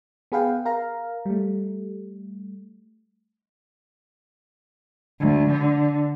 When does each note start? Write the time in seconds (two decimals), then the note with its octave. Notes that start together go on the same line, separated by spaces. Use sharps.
0.32 B3 G#4 B4 F5 G5
0.65 A#4 F5 A#5
1.26 G3 A3
5.20 D2
5.50 D3